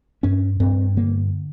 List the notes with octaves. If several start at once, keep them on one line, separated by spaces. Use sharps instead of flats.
G2 C#4
G2 C4
D3 A#3